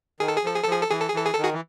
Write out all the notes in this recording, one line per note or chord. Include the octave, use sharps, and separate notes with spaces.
D#3 G#4
A4
G#4
F3 A4
G#4
F3 A4
G#4
A4
E3 G#4
A4
G#4
E3 A4
G#4
D#3 A4
F#4 G#4
E3